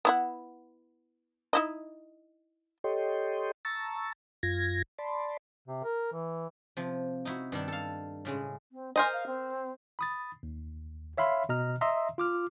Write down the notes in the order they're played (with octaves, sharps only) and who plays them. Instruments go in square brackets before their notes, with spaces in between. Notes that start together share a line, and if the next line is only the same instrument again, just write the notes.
[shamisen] B3 E4 F#5
D#4 E4 D#5
[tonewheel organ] G4 A4 C#5 D#5 G5 C6
A5 A#5 C#6 E6 A6
F#2 F4 G#6 A#6
D5 A5 B5 C6
[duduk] C3
A#4
E3
[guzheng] C3 F3
D#4 E4 F#4
G2 D#3 D4
A4 F5
A2 C#3 G#3
[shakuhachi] C4
[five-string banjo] A#4 C5 D#5 [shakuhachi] G#5
[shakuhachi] F5
C4
[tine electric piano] B5 D#6 A6
D#2
C#5 E5 F5 B5 C6
B2 D#5 A#5 F6
D#5 E5 A#5 C6 D#6 E6
F4 D6 F6